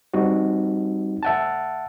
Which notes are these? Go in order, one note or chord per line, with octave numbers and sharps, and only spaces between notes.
G3 C4 D#4 F#4
E5 F#5 A5